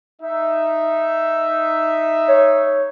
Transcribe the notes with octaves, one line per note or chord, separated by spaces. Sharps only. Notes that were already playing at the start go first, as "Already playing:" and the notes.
D#4 E5
C#5